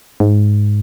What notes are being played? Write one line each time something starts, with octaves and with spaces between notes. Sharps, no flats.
G#2